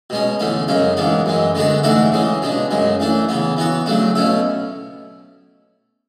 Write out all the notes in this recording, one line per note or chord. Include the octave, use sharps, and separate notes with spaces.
B2 G#3 C#4
E2 D3 A3 C#4
F#2 C#3 G#3 C#4
G#2 E3 B3 D4
F#2 E3 G#3
D3 G#3 B3 D4 F#4
G#2 E3 A3 D4 F#4
C#3 E3 G#3
B2 G#3 D4
F#2 C#3 G#3
E3 A3 D4
C#3 E3 B3
E3 B3 F#4
C#3 F#3 A3 D4
B2 A3 C#4 E4